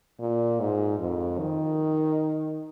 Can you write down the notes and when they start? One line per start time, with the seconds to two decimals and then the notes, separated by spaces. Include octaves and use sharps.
0.20 A#2
0.60 G#2
0.99 F2
1.39 D#3